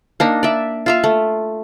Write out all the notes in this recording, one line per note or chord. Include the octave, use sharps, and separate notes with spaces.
A#3 D4 D#4
D5 E5
F4 E5 F5
A3